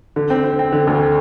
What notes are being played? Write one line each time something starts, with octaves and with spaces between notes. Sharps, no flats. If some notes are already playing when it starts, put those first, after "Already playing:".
D3
C4
C4
C4
D3
D2